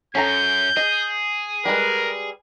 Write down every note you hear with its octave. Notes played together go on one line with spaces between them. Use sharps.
F#2 C#4 A4 A#5 G6
G#4 D#5
G3 G#3 A#4 B4